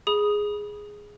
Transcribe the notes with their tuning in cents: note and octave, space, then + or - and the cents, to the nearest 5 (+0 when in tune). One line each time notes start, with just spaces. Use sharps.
G#4 +0 B5 -20 D#6 +0